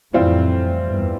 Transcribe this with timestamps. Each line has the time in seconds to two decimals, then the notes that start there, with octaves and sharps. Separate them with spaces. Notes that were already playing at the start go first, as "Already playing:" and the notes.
0.13 F2 A2 E3 G3 C4 F4
0.85 E2 G2